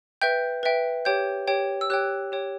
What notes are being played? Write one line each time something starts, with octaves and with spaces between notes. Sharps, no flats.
B4 E5 G5 G6
B4 E5 G5
G4 C#5 G5 G6
G4 C#5 G5
E6
G4 C#5 G5 F#6
G4 C#5 G5